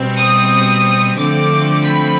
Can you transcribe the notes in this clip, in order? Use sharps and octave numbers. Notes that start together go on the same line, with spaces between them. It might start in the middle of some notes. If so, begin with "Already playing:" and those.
Already playing: B2 G3 C4
D#6
D3 F3 A3 C4 D6
B5